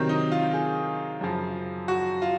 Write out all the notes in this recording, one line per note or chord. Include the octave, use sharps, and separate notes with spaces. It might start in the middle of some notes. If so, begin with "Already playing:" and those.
Already playing: C3 D#3 F#3 C4
D#4
F4
G#4
F#2 C#3 F3
F#4
F4